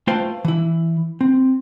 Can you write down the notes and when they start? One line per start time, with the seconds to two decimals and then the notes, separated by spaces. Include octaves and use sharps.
0.07 A3 F4 B4 C5 F5 G5
0.45 E3 E4
1.21 C4